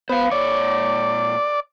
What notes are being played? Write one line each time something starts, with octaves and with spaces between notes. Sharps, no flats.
B3 C5 F5
A#2 C#5 D5